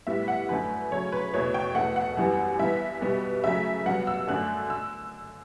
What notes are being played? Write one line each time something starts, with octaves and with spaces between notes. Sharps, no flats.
A2 G3 B3 E5
F#5
F#2 D3 A3 B4
C#3 F#3 A3 C#5
B4
E2 B2 A3 C#5
G5
E2 B2 A3 F#5
F#5
F#2 E3 G3 B3
G2 E3 B3 E5
B2 G3 B3
C#3 F#3 A3 E5
G2 F#3 B3 F#5
E6
F#2 D3 A3 F#6
E6